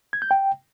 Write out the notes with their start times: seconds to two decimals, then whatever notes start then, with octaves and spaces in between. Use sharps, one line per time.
0.13 G#6
0.22 G6
0.31 G5